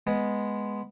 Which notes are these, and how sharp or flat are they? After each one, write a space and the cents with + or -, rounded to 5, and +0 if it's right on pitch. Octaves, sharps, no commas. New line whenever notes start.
G#3 +0 B3 +0